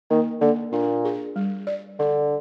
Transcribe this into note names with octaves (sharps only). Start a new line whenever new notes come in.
D#3 A#3
D3 A#3
A#2 D4
G#4
G3
D5
D3 D4